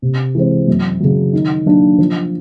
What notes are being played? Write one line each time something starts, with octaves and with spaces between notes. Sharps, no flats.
C3
E3 G#3 C4
F#2
C#3 F#3
D#3
F#3 A#3 D4
F3